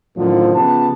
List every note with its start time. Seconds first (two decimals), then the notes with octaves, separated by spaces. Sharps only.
0.16 F#2 A2 D3 D#3 F3
0.55 C#3 F3 B3 G4 A5